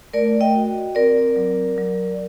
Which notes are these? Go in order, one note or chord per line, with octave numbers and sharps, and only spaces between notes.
A3 A#4 D5
D#5 G5
F#4
C4 A#4 D5
F#3
F#3